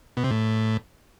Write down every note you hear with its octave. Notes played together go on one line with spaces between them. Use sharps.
B2
C3
A2